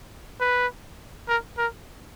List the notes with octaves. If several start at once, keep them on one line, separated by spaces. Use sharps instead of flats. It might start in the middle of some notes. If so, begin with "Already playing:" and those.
B4
A#4
A#4